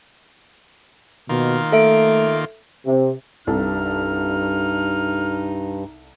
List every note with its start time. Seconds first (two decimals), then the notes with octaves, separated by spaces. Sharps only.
1.29 B2 D#3 A#3 F4
1.72 A3 A4 E5 D7
2.85 C3
3.47 C2 G2 D#4 A4 F6